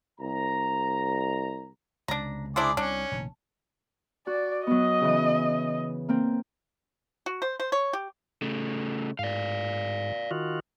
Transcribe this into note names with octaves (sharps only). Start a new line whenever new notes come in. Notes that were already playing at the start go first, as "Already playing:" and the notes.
C2 A#5
C#2 C3 D4 A#5
D4 E4 G#4 C5 D5
C2 C#4 D4
F1 A#1 D#3
F#4 D5
F#3 B3 D#5
C#3 E3
A#3 C4
F#4
C5
C5
C#5
G4
C#3 A3
G#2 D5 F5
D#3 F4 F#4